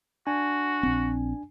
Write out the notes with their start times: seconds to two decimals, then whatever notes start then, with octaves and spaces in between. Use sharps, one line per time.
0.27 D4 F#4 G#5
0.83 A#1 C4